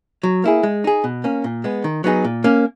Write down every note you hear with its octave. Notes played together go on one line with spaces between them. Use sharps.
F#3
A#3 E4 G#4
G#3
D#4 G#4
B2
A#3 C#4
A#2
G#3 B3
D#3
F#3 B3 D#4 G#4
A#2
A#3 C#4